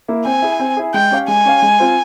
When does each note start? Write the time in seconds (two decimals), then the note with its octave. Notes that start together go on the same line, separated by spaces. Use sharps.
0.08 A#3 E4
0.25 C4 G#5
0.42 E4 G#4
0.59 C4
0.77 E4 G#4
0.94 G#3 G5
1.11 C#4 G4 C#5 F5
1.28 G#3 G#5
1.45 C#4 G4 C#5 F5
1.62 G#3
1.80 C4 F4 C5